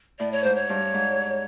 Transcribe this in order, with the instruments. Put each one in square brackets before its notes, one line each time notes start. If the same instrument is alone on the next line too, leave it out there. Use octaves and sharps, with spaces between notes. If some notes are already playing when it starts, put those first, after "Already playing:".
[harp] A2 [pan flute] D5
[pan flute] C#5
[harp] G#2 [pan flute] C5
[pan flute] C#5
[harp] G2
G#2